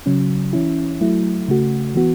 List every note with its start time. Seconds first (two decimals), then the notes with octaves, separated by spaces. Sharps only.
0.06 C#3 F#3 C#4
0.53 E3 C#4 E4
1.01 F#3 A3 E4
1.48 C#3 A3 F#4
1.95 E3 B3 F#4